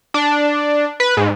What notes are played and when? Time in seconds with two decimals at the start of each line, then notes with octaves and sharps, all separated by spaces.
0.14 D4
1.00 B4
1.17 G#2